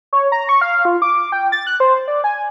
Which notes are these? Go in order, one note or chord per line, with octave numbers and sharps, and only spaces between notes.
C#5
A#5
C#6
F5
F4
D6
G5
A6
F#6
C5
D5
G#5